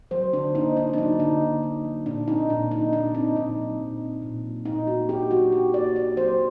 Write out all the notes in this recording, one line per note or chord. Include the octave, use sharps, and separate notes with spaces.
F#3 C5
D3 D4
A#3 D#4
D4 D#4
D4
F#3 D#4
D3 D#4
A#3
D4
F#3
A#2 D4
C4 D#4
A#2 D4
F#3 D#4
A#2 D4
C4 D#4
A#2 D#4
F#3
A#2
C4
A#2
F#3
A#2 D#4
A#3 F#4
D4 G4
F#3 F#4
A#2 G4
A#3 D5
D4 D5
F#3 C5